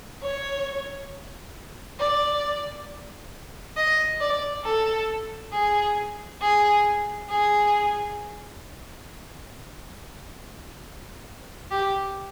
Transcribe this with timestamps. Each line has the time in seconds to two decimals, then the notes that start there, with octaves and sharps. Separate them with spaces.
0.23 C#5
1.99 D5
3.77 D#5
4.21 D5
4.65 A4
5.53 G#4
6.41 G#4
7.30 G#4
11.71 G4